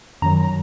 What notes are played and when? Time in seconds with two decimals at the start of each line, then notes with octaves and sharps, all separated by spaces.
0.22 F#2 D#3 F#3 A#5